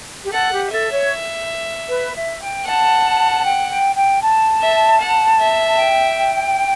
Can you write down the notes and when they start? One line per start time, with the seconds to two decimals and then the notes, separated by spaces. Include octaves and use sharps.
0.24 G4
0.33 A4 F#5
0.52 G4
0.71 A4 E5
0.91 C#5
1.88 B4
2.14 E5
2.41 G5
2.66 F#5 A5
3.45 G5
3.70 G5
3.96 G5
4.22 A5
4.62 E5
5.00 F#5
5.39 E5
5.78 G5